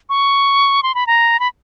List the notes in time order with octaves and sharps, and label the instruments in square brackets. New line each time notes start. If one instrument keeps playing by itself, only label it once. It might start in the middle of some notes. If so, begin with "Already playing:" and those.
[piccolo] C#6
C6
B5
A#5
B5